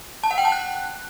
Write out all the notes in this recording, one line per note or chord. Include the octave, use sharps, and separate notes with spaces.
A5
F#5
G5
A5
F#6